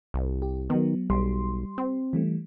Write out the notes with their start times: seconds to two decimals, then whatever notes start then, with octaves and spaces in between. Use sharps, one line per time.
0.14 C2
0.42 G4
0.70 D#3 F#3 B3
1.10 B1 G3 C6
1.78 C4
2.13 E3 G3 A3